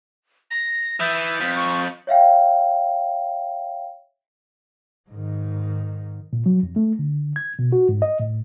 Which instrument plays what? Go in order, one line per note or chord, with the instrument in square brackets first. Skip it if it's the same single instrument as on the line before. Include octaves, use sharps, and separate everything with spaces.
[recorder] A#6
[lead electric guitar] E3 [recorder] E5 [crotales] D#6 G6 A6
[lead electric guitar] F2 [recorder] B6
[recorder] C#6
[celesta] C#5 E5 F5 G5
[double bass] G#2 D#3
[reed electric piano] A#2
F#3
F2
A3
D3
G#6
B2
F#4
G#2
D#5
A2